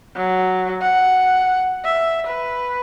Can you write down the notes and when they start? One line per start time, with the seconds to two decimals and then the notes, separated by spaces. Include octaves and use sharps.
0.16 F#3
0.82 F#5
1.84 E5
2.26 B4